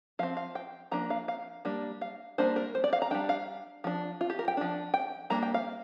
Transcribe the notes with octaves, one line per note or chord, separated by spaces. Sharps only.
F3 C4 F5
F5
G5
F3 A#3 D4 A#5
F5
F5
G3 A#3 D4
F5
G3 A#3 D4 C5
A#4
C5
D5
F5
A#5
G3 D4 G5
F5
F3 D4
F4
G4
A#4
G5
F3 D4
G5
G3 A#3 D4 A#5
G5
F5